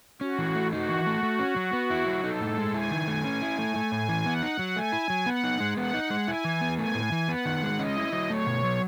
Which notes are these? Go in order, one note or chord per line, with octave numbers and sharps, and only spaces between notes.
C#4 F#4
E3
A3
D#4 F#4
E3
A3
A3
C#4
F#3
B3
E4
F#3
D#4 A4
A2
G#3
E4 G#5
D#3
A3
C#4
E4
A3
A3
A2
E3
B3 F#5
D#4
F#3
A3 G#5
E4
F#3
B3 F#5
D#4
G#3
B3 F#5
D#4
G#3
E4 G#5
E3
B3
A3 G#5
A2
E3
B3 F#5
D#3
G#3
C#4 D#5
E4
F#3
A3 C#5
B2
F#3